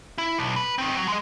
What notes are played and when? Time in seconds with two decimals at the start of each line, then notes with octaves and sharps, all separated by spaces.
0.18 E4
0.38 B1
0.56 B4
0.78 D#3 C4
0.97 F#3
1.08 G#3 D#5